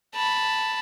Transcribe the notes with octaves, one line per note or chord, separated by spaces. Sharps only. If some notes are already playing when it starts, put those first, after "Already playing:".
A5 B5